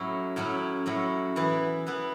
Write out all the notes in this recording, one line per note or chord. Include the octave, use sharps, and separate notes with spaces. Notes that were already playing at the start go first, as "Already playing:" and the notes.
Already playing: A2 F#3 C#4 E4
A2 F#3 C#4 E4
A2 F#3 C#4 E4
E3 B3 E4 B4
E3 B3 E4 B4